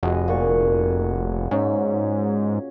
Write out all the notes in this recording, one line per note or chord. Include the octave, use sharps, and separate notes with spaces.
F1 F#4 G#4 D#5
A#2 F#5 C#6
G#2 C#4